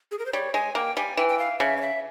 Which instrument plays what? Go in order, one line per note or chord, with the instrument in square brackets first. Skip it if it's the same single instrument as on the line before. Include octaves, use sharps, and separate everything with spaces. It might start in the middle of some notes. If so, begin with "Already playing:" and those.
[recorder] G#4
A#4
C5
[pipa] G3 [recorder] C#5
[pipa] G#3 [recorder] G#5
[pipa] A#3 [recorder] G5
[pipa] G3 [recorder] G#5
[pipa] E3 [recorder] G5
[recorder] G5
F5
[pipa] C#3 [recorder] E5
[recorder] C#5
E5